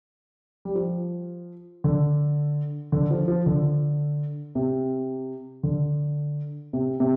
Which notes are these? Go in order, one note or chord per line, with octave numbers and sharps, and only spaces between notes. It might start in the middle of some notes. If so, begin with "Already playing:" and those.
G3
F3
D3
D3
F3
F3
D3
C3
D3
C3
C3